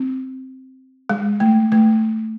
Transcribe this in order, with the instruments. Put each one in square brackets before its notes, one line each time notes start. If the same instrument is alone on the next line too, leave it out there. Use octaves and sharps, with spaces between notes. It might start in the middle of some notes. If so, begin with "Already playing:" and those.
Already playing: [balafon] C4
G#3
A3
A3